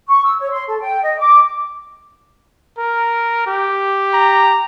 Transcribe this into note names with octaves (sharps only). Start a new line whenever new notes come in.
C#6
E6
C#5
C6
A4
G5
D#5
D6
A#4
G4
A#5